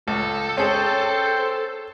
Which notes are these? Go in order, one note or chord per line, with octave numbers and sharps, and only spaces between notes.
C#2 A4
C#4 G#4 C5 G5